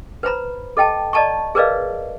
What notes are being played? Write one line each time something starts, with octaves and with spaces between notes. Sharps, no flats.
B4 C5 A#5 B5
A4 D#5 G5 A5
D5 D#5 A5 A#5 C#6
G#4 A#4 B4 D5 D#5 F5